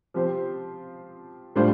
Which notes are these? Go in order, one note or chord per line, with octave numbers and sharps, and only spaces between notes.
F3 C4 G4 C5
A2 G3 D4 F4 C5